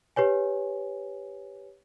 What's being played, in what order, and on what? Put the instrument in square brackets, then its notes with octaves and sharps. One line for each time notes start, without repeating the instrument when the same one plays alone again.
[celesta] G4 B4 C#5 G#5